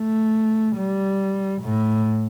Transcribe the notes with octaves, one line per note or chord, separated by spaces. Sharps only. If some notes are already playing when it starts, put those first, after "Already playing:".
Already playing: A3
G3
A2